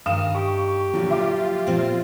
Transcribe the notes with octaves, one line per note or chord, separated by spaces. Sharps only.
G2 D#3 D#4 A#4 F5 D#6 E7
G4 C#6
A#2 D3 F3 F#3
F4 E5 D6
A#2 F3 C4